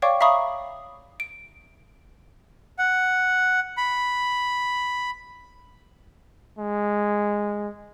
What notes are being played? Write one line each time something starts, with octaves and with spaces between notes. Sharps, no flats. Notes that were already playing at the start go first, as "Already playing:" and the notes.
C#5 D5 F5 G5 C#6 D6
E5 F5 A#5 B5 C#6 D#6
D7
F#5
B5
G#3